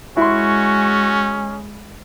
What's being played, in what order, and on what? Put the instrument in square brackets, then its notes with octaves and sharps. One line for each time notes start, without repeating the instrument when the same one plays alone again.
[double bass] G#3 [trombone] C#4 [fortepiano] E4 C6 [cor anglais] F#4